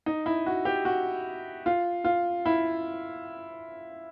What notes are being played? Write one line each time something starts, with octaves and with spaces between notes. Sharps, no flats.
D#4
E4
F#4
G4
F#4
F4
F4
E4